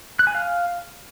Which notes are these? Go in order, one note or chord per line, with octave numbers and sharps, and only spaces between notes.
F#6
G#5
F5